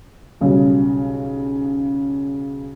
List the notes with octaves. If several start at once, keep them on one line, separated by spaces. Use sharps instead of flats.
B1 C#3 G3 C#4